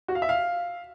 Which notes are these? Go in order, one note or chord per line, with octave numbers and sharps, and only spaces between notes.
F#4
F5
E5
F5